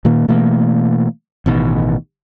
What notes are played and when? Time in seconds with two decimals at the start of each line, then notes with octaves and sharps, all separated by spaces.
0.05 A#2 D#3 A#3
0.28 B2 E3 A3 A#3
1.46 A1 B2 D#3